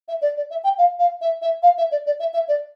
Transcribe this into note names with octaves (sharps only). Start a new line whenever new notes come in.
E5
D5
D5
E5
G5
F5
F5
E5
E5
F5
E5
D5
D5
E5
E5
D5